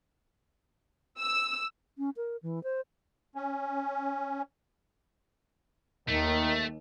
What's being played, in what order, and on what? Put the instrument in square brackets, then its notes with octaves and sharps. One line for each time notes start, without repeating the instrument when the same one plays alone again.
[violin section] E6
[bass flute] C#4
A#4
E3
C5
[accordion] C#4
[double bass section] D#2 [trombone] D#3 [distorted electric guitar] A3